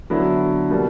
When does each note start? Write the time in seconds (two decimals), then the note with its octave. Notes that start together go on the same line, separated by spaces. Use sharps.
0.10 D3 F#3 B3 E4
0.70 B2 G3 A#3